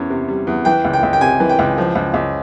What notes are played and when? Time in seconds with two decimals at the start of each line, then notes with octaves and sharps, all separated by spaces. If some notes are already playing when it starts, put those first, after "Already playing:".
Already playing: E2 C#4
0.10 C3
0.28 G3
0.47 E2
0.65 E3 G5
0.84 C#2
0.93 G5
1.03 C#2
1.13 G5
1.21 C3 G#5
1.40 E3
1.49 G5
1.59 C#2
1.78 F3
1.95 C#2
2.14 C#2